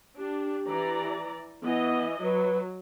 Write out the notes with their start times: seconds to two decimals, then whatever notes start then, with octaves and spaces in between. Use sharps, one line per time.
0.18 D4 G4
0.68 E3 D5 A#5
1.63 E3 B3 D#5
2.24 F#3 B4